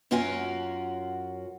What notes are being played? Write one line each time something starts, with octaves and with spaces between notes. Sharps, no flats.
F#2 C#4 F4 F#4 A#4 G#5